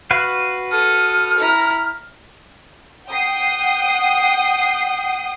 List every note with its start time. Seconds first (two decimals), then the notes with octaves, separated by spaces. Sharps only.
0.11 F#4 B4 F5
0.72 A4 D#6 F6
1.38 E4 A#5
3.08 F#5 G5 D#6 C7